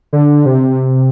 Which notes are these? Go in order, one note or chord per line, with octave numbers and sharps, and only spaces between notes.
D3
C3